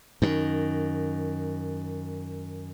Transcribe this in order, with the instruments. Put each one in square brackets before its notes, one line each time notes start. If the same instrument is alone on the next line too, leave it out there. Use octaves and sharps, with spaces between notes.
[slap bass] F#2 D#3